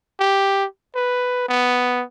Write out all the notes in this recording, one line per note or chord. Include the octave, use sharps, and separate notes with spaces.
G4
B4
B3